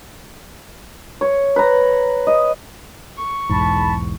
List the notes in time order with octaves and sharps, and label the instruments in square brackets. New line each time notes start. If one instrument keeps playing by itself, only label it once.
[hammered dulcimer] C#5
B4 A#5
D#5
[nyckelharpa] C#6
[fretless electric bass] B1 E2 G#2 [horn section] A5 B5